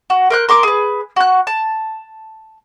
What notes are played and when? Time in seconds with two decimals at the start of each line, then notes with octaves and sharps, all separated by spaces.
0.10 F#4
0.30 A#4 C5 F#6
0.49 A#4 C6 D6
0.63 G#4 B4
1.16 F#4 F#6
1.47 A5